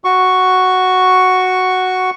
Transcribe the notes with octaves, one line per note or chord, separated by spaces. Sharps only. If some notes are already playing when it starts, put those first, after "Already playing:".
F#4 C#6